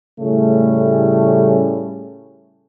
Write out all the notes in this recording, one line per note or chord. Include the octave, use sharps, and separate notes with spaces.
A2 C#3 G3 A3 C#4